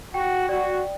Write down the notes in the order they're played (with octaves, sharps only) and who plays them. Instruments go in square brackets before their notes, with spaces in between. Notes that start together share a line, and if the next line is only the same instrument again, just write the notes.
[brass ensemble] F#4 [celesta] G5
[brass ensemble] F#4 [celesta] D5